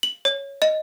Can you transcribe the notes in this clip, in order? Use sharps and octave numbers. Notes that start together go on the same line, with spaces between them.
F#7
C#5
D#5